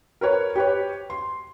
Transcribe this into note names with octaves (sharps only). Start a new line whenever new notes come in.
A#4 B4 C#5
G4 B4 C#5
C6